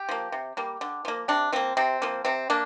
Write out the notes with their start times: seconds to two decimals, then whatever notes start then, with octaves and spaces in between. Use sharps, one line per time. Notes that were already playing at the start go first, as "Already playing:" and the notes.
Already playing: G4
0.09 F3 A#3
0.32 C3
0.57 G3 A#3
0.81 D3
1.05 F3 A#3
1.28 C3 D4
1.53 F3 A#3 C4
1.77 C3 C4
2.02 F3 A#3
2.25 C3 C4
2.50 A#3 D4